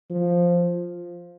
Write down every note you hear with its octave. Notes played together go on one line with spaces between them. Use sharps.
F3